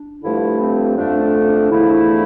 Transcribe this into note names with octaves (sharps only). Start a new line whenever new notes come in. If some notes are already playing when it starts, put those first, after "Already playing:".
Already playing: D4
G2 D3 F3 A3 E4
C4
F2 D3 F3 A3 D4
D4
D4
E2 D3 F3 A3 E4